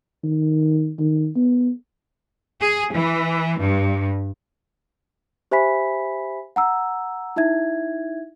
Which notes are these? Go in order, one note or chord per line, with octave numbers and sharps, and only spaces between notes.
D#3
D#3
B3
G#4
E3
G2
G4 C5 E5 G#5 B5 B6
F#5 A#5 E6
D#4 E4 E5 G#6